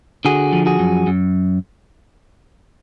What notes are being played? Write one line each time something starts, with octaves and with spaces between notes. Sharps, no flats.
D3 F#4 G#4
F3
F#4 G#4
F#2
F#2